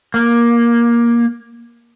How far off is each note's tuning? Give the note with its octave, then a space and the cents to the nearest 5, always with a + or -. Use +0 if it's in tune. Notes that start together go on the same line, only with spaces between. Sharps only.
A#3 +15